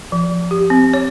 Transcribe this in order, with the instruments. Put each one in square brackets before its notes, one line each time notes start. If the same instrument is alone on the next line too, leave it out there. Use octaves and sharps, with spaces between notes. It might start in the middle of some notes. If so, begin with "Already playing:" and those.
[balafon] F3
G4
C4
C#5